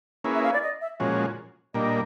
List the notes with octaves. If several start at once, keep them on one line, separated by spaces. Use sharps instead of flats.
A#3 C#4 E4 G#4 B4
E5
F5
D5
D#5
E5
A#2 F3 G#3 C#4 F#4 C#5
A#2 G3 A#3 D4 D#5